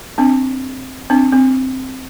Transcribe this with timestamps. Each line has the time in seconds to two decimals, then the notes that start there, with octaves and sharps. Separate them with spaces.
0.18 C4 D4
1.10 C4 D4
1.33 C4